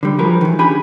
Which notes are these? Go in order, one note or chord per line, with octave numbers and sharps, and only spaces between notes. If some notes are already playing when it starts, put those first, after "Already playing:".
D3 G3
F3 F#3 G#4 A#4 B4
D#3 E3
C#4 D4 G4 G#4 G#5 B5